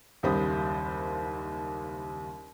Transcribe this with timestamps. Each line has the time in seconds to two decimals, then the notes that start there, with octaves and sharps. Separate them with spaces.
0.23 F#1 D#2 G3 C5 B5 D#6